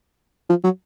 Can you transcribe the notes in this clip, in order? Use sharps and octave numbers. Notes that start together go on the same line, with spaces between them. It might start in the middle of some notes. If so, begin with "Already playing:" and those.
F3
F#3